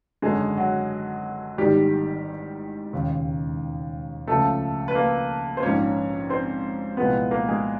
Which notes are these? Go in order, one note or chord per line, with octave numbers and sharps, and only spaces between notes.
G#1 F#2 D3 F#3 G#3 G#4
F#3 F#4
A1 G#2 D#3 G3 G4
E1 D#2 C#3
C#2 C#3 F3 A3 A4
B4
A#3 A#4
C5
A#1 G#2 F3 A#3 C#4 C#5
C4 C5
C2 A#2 F3 G#3 B3 B4
A#3 A#4
G#3 G#4